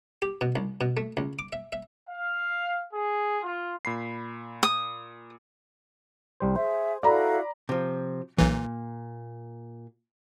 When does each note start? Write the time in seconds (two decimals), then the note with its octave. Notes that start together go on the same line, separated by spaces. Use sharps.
0.22 G4
0.41 B2
0.56 C2
0.81 B2
0.97 A3
1.17 C#2
1.39 D6
1.53 E5
1.73 E5
2.10 F5
2.93 G#4
3.42 F4
3.85 A#2 B5 C7
4.63 D#6
6.40 C2 G3 C5
6.56 G#4 C5 E5
7.03 E4 F#4 A4 D5 F5 A#5 B5
7.69 C3 F3
8.38 B1 A#2 E3